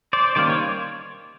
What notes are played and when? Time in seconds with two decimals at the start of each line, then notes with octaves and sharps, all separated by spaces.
0.13 C5 D5
0.35 D#3 G3 A#3 C#4 C5 D5
0.50 C#5